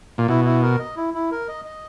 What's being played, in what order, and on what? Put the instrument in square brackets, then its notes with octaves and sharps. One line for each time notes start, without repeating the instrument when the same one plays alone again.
[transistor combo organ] A#2
[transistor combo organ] B2 [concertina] E4
[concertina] E4
A#4
D#5
E4
E4
A#4
D#5
D#5